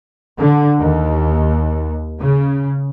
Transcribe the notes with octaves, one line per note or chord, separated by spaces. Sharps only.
D3
D#2
C#3